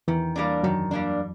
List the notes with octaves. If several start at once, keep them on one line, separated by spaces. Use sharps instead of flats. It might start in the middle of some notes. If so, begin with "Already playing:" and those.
E2 D#3 E3
G3 A#3 D4
F#2 D#3 F#3
G3 A#3 D4